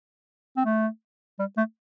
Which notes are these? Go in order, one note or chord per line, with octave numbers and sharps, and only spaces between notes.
C4
A3
G3
A3